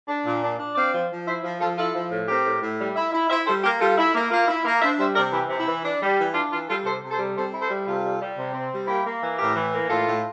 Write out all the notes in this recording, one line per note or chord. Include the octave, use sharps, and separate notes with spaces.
D4
A#2
D4
D4
C4 D5 F5
F3
F3
E4 C5 E5
F3
F3 F4 A4
E4 F4 A4
F3
A2
C4 G4 A#4
A2
A2
G3
E4
E4
E4 C5 E5
G3 A4 C5
A#3 G4 A#4
G3 F4 A4
E4
A#3
A#3 F4
E4
A#3
D4 C5 E5
G3 C5 E5
C3 A#4 D5
E3 E4 G4
C3
E4
E3
D4
G3
E3
D4 F4
E3 F4
G3 F4 A4
C3 A4 C5
C3
A4 C5
G3
C4 A4 C5
E4
A4 C5
G3
C3 F4 A4
G3
G3
C3
C4
G3
A#3 E4 G4
A#3
E3
A2 G4 A#4
E3
A#3
A2 F4 A4
A2